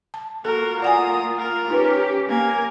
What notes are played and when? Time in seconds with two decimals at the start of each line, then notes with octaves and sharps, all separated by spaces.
0.14 A5
0.45 A#3 F4 F#4 A4 A#4
0.82 D5 F#5 G#5 A#5 D#6
1.39 A#4
1.70 C#4 D#4 G4 B4
2.29 A#3 A#4 G#5